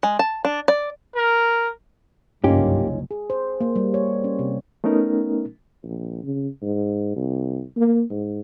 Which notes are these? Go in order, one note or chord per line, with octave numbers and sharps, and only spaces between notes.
G#3
A5
D4
D5
A#4
F#1 C2 G2 A#3 C#4 D#4 F4 G4
G#4
C5
A#3
G3
C#5
C#4
C3
A3 B3 C#4 D#4 A#4
A#1
C#3
G#2
C2
A#3
G#2